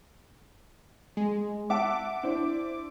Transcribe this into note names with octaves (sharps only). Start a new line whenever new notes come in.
G#3
E5 F#5 A5 D6
D4 E4 C5